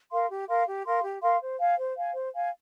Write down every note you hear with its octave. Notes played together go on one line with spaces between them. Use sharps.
A#4 F5 C6
G4
A#4 F5 C6
G4
A#4 F5 C6
G4
A#4 F5 C6
C5
F5 G#5
C5
F5 G#5
C5
F5 G#5